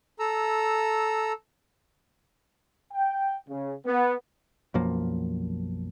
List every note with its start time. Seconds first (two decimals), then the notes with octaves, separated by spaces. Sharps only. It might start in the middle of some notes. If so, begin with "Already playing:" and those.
0.19 A4 A#5 E6
2.92 G5
3.48 C#3
3.86 B3
4.74 B1 F#2 F3 A#3